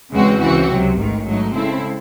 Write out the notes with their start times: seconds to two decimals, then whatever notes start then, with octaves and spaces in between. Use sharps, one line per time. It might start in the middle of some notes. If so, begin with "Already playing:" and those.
0.14 E2 C#3 G#3 C4 F#4
0.41 C#2 C#3 E3 C4 F#4
0.70 C#2 C3 F#3
0.98 A1 G#2 D#3
1.26 G#2 F#3 A3 D#4
1.54 C#3 G#3 C4 E4 A4